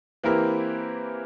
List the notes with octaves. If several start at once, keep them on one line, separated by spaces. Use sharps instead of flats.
E3 A#3 C4 E4 G4 A#4